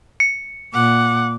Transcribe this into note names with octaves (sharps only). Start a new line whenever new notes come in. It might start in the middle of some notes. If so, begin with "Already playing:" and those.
C#7
A#2 F#5 D6